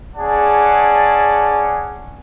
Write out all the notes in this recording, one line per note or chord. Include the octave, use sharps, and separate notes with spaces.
C#4 G#4 D5 F#5 A5